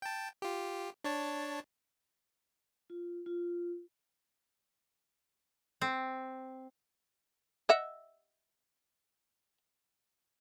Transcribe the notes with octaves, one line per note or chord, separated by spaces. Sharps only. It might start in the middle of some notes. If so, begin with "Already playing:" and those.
G5 A5
F4 G4
D4 C#5 A5
F4
F4
C4
D#5 E5 F#5